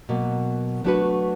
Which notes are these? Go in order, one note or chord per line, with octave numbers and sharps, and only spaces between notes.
B2 F#3 A#3
F#3 A3 D4 F#4 B4